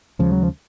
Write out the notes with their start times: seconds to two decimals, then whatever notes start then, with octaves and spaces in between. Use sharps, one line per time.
0.19 D#2 C#3 F3 G#3
0.32 F#3
0.43 F3